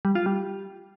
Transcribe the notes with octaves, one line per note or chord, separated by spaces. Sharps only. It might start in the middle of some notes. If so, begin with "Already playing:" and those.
G3
F4
G3